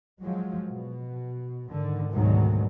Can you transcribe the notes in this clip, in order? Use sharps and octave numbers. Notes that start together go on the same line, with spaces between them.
F3 F#3 G#3
B2
G#2 D3 D#3
D2 G#2 B2 D#3 F#3 G3